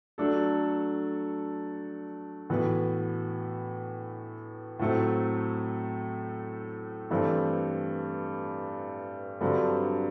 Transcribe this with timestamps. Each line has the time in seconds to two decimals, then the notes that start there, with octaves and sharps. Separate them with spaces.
0.18 F#3 A3 D4 A4
2.50 A2 E3 B3 F#4 B4
4.79 A2 F#3 A3 C4
7.10 G2 E3 A3 C4
9.41 G2 D3 F#3 C4